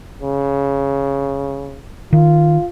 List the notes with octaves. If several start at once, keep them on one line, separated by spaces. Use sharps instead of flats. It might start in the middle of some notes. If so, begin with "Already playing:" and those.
C#3
D#3 F4